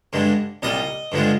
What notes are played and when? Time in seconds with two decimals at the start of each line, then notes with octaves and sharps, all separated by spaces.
0.13 G2 D3 G#3
0.62 C2 A#2 G3 D#5
1.12 G2 D3 F3 G#3